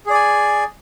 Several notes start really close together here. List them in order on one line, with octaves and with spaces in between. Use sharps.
G#4 D5 G#5